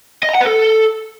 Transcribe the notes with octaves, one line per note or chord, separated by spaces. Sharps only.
D#5
A#5
F#5
B4
A4